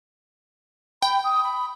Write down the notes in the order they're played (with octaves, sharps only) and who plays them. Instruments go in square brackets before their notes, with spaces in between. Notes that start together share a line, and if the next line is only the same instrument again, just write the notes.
[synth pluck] G5 [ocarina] B5
[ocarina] D#6
B5